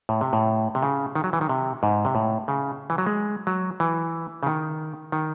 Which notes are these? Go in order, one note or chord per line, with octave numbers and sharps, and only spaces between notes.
A2
C3
A2
C3
C#3
D#3
F#3
E3
D#3
C3
G#2
C3
A2
C#3
E3
F#3
G#3
F#3
E3
C#3
D#3
D#3